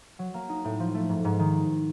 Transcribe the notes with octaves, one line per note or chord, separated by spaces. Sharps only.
F#3
A#3
D#4
A2
F3
A3
G#2
G#2
D#3